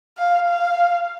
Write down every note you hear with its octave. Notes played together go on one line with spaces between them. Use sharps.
F5
F5